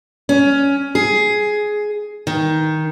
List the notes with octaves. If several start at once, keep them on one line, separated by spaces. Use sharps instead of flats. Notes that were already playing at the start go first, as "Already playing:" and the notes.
C#4
G#4
D#3